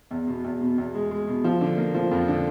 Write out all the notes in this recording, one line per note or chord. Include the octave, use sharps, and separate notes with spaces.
E2
B2
E2
B2
E2
G#3
G#3
B2
F3
D3
A#3
F3
F2
D3